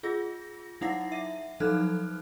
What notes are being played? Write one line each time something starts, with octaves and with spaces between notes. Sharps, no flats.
F4 G#4 A#6
F#3 D#4 E4 F#5 A#6 C7
E5
F3 F#3 D#4 A4 F6 F#6